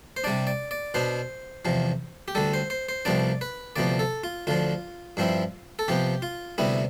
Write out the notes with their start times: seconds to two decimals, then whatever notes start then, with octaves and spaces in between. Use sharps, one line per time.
0.17 C5
0.24 C3 G3 D4 D5
0.47 D5
0.71 D5
0.94 B2 B3 D4 C5
1.65 E2 C3 F3
2.28 G4
2.35 D2 D3 G3 A4
2.54 C5
2.70 C5
2.89 C5
3.05 C2 C3 F3 B3 D4 D5
3.41 B4
3.76 D2 C3 F3 B3 D5
3.99 A4
4.24 F4
4.47 D2 D3 F3 F4
5.17 G2 F3 C4 E4
5.79 A4
5.88 C3 F3 B3 G4
6.22 F4
6.58 D2 C3 G3 B3 E4